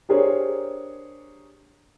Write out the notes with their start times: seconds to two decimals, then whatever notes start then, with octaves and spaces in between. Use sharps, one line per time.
0.09 D4 G4 G#4 A#4 C5 C#5